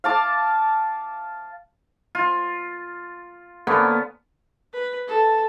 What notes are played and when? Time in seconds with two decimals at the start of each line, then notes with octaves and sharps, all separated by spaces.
0.04 F5 A5 D6
2.15 F4
3.67 D3 A#3 B3 C#4
4.73 B4
5.08 A4